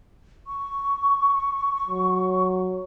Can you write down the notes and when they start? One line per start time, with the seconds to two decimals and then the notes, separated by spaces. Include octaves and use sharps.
0.47 C#6
1.88 F#3